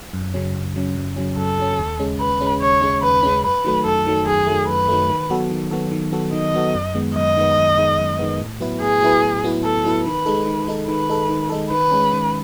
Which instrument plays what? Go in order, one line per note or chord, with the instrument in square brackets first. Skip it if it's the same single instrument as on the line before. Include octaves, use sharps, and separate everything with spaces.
[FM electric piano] F#2
C#3 F#3 C#4
F#2
C#3 F#3 C#4
F#2
C#3 F#3 C#4
[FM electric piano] F#2 [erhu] A4
[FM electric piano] C#3 F#3 C#4
D#2
C#3 G#3 C#4
[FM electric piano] D#2 [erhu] B4
[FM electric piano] C#3 G#3 C#4
[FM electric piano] D#2 [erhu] C#5
[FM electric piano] C#3 G#3 C#4
[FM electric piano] D#2 [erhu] B4
[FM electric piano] C#3 G#3 C#4
[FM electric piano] F#2 [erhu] B4
[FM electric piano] D#3 F#3 A3
[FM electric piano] F#2 [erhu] A4
[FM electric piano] D#3 F#3 A3
[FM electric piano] F#2 [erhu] G#4
[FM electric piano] D#3 F#3 A3
[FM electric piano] F#2 [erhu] B4
[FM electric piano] D#3 F#3 A3
D#3
F#3 B3 F#4 A4
D#3
F#3 B3 F#4 A4
D#3
F#3 B3 F#4 A4
[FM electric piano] D#3 [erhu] D#5
[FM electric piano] F#3 B3 F#4 A4
F#2
D#3 G#3 B3
[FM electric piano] F#2 [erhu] D#5
[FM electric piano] D#3 G#3 B3
F#2
D#3 G#3 B3
F#2
D#3 G#3 B3
A2
F#3 B3 E4 B4
[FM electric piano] A2 [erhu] G#4
[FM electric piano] F#3 B3 E4 B4
A2
F#3 B3 E4 B4
[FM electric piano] A2 [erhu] A4
[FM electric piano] F#3 B3 E4 B4
[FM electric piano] D#3 [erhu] B4
[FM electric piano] G#3 D#4 A4
D#3
G#3 D#4 A4
[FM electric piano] D#3 [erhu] B4
[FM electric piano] G#3 D#4 A4
D#3
G#3 D#4 A4
[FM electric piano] D#3 [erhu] B4
[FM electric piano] G#3 C#4
D#3